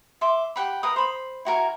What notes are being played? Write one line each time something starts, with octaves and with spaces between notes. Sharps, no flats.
E5 C6 D6
G4 F#5 B5
A#4 B4 F5 D#6
C5 B5
E4 F#4 A#4 G#5